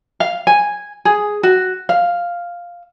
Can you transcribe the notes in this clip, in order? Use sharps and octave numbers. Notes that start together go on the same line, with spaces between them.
F5
G#5
G#4
F#4
F5